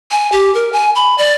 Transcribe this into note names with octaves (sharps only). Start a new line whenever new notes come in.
G#5
G4
A#4
G#5
B5
D5